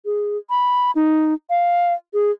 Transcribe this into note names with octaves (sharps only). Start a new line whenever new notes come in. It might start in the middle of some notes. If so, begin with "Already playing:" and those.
G#4
B5
D#4
F5
G#4